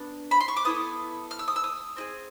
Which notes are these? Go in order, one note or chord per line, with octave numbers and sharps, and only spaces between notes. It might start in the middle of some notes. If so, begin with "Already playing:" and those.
Already playing: B3 D4
B5
C6
C#6
D6
B3 E4 A4 D#6
F6
E6
D#6
E6
D#6
C4 E4 G#4